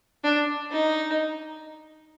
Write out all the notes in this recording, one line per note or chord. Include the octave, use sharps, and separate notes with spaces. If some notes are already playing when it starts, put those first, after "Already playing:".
D4
D#4